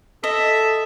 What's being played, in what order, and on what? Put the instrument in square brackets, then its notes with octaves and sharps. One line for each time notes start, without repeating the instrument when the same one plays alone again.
[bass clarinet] A4 [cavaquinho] D#5 [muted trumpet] E5